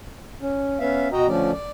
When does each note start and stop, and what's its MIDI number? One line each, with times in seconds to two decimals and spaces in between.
0.41 0.79 61
0.80 1.08 59
0.80 1.08 61
0.80 1.08 76
0.80 1.08 77
1.13 1.27 47
1.13 1.27 66
1.13 1.27 75
1.13 1.27 79
1.13 1.27 82
1.28 1.51 50
1.28 1.51 53
1.28 1.51 57
1.28 1.51 61
1.28 1.51 74
1.53 1.71 74